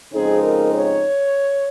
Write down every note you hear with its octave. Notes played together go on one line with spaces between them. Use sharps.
F2 C#3 G#3 C4 D#4 G#4
A#4
C#5